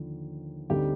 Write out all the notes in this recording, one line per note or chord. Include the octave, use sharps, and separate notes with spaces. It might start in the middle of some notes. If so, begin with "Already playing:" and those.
Already playing: D#2 D3 F3
D2 D3 G3 C4 D#4 G4